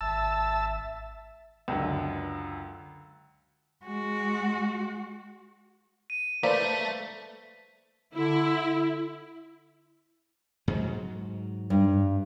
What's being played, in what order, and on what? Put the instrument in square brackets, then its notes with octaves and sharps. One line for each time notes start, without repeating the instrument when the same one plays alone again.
[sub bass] G#1 [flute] E5 [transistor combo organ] A5 E6
[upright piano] C#2 F#2 D3
[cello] G#3 F#4
[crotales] D#7
[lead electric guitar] A3 [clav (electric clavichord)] A#3 [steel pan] B4 C5 D5 [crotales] B6
[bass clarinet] D3 [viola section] E4
[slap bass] G#2 F#3
[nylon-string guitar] G2